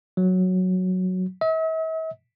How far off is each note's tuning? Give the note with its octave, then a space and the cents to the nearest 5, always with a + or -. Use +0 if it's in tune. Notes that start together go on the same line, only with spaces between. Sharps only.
F#3 -5
E5 -45